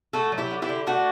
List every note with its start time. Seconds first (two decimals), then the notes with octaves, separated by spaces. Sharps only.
0.13 A3 F#4 A4
0.32 F#3
0.38 E4 G4
0.51 D3
0.62 E4 G4
0.69 D3
0.86 A3 D4 F#4